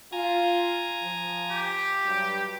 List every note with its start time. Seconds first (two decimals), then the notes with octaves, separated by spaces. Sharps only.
0.12 F4 G#5 A#5
1.02 F3
1.51 G4
2.05 G2 F#3